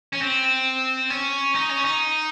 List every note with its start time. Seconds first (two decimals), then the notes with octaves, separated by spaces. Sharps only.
0.13 C#4
0.21 C4
1.10 C#4
1.55 D#4
1.69 C#4
1.84 D#4